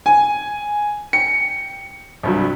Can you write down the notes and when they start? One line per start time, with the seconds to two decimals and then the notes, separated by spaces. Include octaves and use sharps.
0.06 G#5
1.13 G5 C#7
2.23 C2 G2 F#3